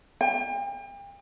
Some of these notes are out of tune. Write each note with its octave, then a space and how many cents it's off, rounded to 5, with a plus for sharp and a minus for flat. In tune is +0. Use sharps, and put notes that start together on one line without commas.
G5 +35